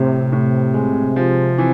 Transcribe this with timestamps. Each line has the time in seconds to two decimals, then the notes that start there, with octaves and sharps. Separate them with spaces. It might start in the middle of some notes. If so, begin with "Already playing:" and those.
Already playing: A2 C3
0.32 A2
0.74 G#3
1.16 F3
1.58 E3